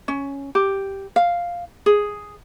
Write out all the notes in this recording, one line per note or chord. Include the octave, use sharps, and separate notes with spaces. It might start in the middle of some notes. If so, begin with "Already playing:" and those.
C#4
G4
F5
G#4